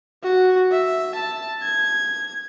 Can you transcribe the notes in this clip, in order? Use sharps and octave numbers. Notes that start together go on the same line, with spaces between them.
F#4
E5
A5
G#6